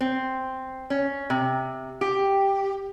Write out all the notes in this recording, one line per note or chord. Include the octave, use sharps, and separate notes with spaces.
C4
C#4
C3
G4